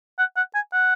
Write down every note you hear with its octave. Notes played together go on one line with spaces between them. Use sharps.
F#5
F#5
G#5
F#5